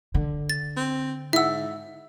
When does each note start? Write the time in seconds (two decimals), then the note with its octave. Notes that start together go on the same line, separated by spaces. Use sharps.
0.14 D3
0.49 A6
0.77 C4
1.33 G#2 E4 E5 F#5 E6